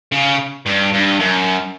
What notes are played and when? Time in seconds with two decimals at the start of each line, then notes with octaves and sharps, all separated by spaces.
0.12 C#3
0.66 G2
0.93 G2
1.19 F#2